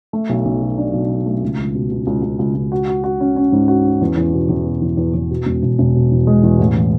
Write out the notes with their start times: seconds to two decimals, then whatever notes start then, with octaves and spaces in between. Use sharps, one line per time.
0.13 A3
0.29 B1
0.45 B1
0.61 B2
0.78 D4
0.93 B1
1.10 D4
1.26 A3
1.43 C#2
1.58 C#2
1.75 B2
1.91 C#2
2.07 C#2
2.23 C#2
2.39 C#2
2.55 C#2
2.72 F#4
2.88 F#4
3.04 F#4
3.20 C#4
3.36 C#4
3.52 G#2
3.68 F#4
3.85 C#4
4.01 E2
4.17 E2
4.34 B2
4.49 E2
4.66 B2
4.82 E2
4.97 E2
5.14 E2
5.31 B2
5.46 E1
5.63 E1
5.79 E1
5.95 B2
6.11 E2
6.27 G#3
6.43 E2
6.59 A1
6.75 E3